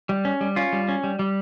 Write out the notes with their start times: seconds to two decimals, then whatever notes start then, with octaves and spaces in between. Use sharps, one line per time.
0.09 G3
0.25 C#4
0.41 G3
0.56 C#4 F4
0.73 G3
0.88 C#4
1.04 G3
1.19 G3